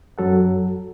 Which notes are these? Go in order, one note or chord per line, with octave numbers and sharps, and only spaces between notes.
F#2 F#3 A4 F#5